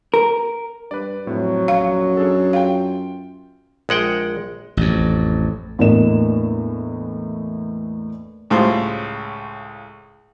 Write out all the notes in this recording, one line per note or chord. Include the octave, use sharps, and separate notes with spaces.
A#4
G2 B4 D5
F2 A2 F#3
A#1 F#2 F5 C#7
D4 G#4 A4
F4 F5 G5
A#1 G#3 F#5 G5
A1 F2
E2 A2 A#3 D4 D#5 E7
C#2 A2 G3 F4 C5